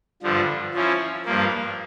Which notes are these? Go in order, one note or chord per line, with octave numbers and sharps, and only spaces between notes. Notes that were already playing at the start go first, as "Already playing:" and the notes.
G2 D3 F3
F3 C#4 E4
G2 F3 A#3